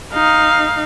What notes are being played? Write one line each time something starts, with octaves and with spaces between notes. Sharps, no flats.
D#4 F5